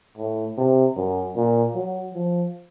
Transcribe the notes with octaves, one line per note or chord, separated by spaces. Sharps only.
A2
C3
F#2
A#2
F#3
F3